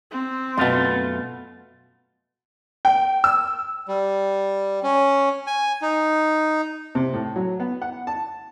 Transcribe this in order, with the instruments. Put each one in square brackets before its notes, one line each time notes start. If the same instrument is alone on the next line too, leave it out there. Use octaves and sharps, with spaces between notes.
[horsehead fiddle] C4
[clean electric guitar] F#2 A3 F4 [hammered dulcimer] B2 C6
[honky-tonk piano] G5
E6
[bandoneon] G3
C#4
G#5
D#4
[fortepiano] C3
A2
F#3
B3
F#5
A5